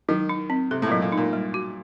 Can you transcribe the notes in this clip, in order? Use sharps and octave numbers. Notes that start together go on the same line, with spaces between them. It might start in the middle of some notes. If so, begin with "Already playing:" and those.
D#3 F#3
D#4
C4
C3 A4
A2
A#2
F#3
A#2
A#2 D#4
G3
F#4